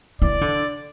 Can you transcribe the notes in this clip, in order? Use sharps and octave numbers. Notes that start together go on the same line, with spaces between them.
E3 D5
D3